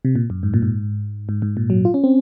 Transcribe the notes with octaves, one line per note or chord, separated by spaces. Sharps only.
C3
A#2
F#2
G#2
A#2
G#2
G#2
G#2
A#2
F#3
F4
C#4
C4